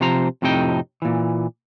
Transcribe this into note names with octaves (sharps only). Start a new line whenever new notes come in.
C3 F3 C5 A#5
F2 A2 C3 D#4 G5
A#2 E3